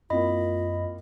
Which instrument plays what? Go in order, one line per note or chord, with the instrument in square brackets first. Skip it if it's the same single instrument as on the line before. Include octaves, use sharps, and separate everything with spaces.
[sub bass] F#2 [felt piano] A#3 C4 E4 [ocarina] F4 [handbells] D#5 B5